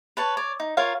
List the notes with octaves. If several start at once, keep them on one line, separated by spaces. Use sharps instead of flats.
B4 C#5 A5
C#5 D5
D#4
F4 A#4 C#5 F5